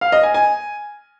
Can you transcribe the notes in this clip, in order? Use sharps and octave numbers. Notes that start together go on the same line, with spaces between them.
F5
D#5
G#5
G#5